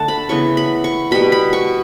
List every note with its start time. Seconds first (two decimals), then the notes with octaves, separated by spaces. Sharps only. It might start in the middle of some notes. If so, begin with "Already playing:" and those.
Already playing: D3 A3 D5 F#5 A5
0.08 B5
0.29 C#3 E3 B3 C#6
0.57 B5
0.84 C#6
1.11 B2 G3 B3 B5
1.32 B5
1.53 C#6